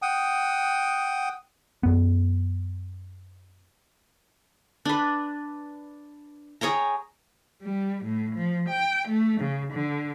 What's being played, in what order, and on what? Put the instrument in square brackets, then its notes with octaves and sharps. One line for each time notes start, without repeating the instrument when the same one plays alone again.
[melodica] F#5 G5 D#6
[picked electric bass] F#2 B3
[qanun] D4 B4
G#4 C#5 G5 A#5
[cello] G3
A2
F3
G5
A3
C#3
D3